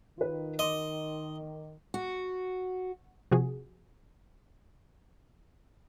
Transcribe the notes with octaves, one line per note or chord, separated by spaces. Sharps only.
D#3 F4 B4
D#5 C6 D6
F#4
C3 F3 F#4 G#4